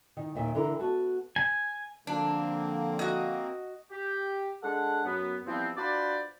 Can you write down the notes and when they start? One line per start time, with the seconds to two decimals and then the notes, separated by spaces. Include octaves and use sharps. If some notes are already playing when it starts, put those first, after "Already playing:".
0.17 D#3
0.35 D#2 A#2 D#3 E5
0.55 D3 E3 E4 A#4
0.79 B3 F#4 F#5 A5
1.36 G#5
2.07 D3 F3 A#3 C4 D4
2.99 F#4 D#5
3.91 G4
4.63 G#3 D4 A4 F#5
5.05 F#2 B3
5.47 E3 F3 G3 B3 C4
5.77 D4 F4 F#4 B4 C5 D5